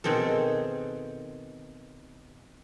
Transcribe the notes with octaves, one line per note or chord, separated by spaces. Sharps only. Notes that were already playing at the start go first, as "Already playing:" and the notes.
B2 D#3 C4 G#4 A4